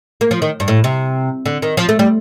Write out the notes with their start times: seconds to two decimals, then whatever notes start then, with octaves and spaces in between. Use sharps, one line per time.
0.21 A#3
0.31 F3
0.42 D#3
0.60 G2
0.68 A2
0.84 C3
1.46 D3
1.62 D#3
1.77 F3
1.89 A3
1.99 G3